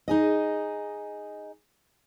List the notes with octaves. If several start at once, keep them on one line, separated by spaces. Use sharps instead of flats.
D#4 G#4 D#5